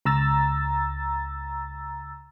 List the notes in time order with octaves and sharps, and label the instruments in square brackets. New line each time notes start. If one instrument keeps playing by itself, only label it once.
[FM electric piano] C#2 A#5 E6 A6